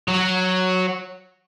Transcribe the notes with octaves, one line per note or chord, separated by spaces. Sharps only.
F#3